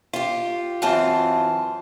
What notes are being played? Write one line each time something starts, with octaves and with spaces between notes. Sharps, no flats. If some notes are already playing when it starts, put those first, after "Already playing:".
F4 G4
F#2 E3 C4 F4 G#5 A5